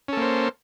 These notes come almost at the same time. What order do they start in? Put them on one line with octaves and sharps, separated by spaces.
C#4 A4 A#3 C5